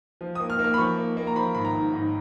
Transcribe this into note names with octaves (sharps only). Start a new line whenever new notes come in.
F3
D#6
A#3
F6
A#3
F6
B5
F3 C#6
A#3
A#3
A#5
F3 B5
G#1 B5
A#5
G#2
G#2